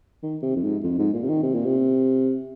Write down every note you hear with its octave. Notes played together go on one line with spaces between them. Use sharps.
D#3
C3
F2
G#2
F2
G#2
A#2
C3
D#3
C3
A#2
C3